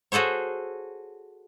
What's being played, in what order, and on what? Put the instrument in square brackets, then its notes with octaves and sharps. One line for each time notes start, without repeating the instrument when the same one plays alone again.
[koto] F#4 G#4 A4 C5 C#5